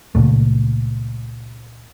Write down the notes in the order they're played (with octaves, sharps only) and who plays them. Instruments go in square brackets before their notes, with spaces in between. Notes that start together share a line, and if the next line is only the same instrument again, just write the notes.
[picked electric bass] C#2 F#2 A#2 A3